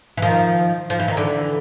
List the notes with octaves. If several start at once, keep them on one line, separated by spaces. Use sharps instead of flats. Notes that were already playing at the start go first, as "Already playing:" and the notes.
E3
D#3 F3
F3
E3
D#3
D3 E3